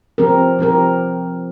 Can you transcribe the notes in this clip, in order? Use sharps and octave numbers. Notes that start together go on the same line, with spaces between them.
F3 C4 G4 A#4
F3 C4 G4 A#4